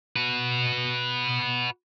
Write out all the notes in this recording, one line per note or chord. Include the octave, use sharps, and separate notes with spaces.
F#4 B4